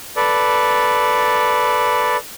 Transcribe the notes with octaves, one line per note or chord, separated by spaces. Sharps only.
A4 B4 D5